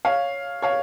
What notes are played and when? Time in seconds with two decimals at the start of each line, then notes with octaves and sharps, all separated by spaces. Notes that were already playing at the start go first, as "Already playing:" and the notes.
0.05 C#5 F5
0.62 C#5 F5